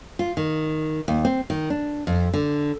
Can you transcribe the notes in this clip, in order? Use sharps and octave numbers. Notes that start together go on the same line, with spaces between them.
F4
D#3
D#2
C4
D#3
D4
F2
D3